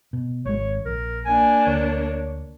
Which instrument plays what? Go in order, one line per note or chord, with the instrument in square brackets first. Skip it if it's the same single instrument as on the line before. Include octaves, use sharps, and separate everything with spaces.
[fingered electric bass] B2
[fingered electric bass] G#1 G#3 [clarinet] C#5
[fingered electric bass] A#1 [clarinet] A#4
[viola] A#3 D4 [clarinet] G#5
[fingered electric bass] D2 [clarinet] C#5